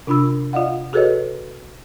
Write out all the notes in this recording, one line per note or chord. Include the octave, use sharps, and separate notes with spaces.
C3 D4 F4 B5 E6
F4 D5 D#5 F5 F#5
F#4 G#4 A4 B4 C#5 D#5